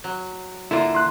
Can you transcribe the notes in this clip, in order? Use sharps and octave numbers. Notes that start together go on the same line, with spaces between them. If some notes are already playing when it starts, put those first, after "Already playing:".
F#3
D3 A#3 E4 F4
C6 F#6